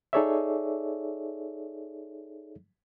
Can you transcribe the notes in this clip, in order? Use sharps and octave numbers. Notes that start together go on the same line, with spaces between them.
D#4 G#4 A4 C#5 D5 E5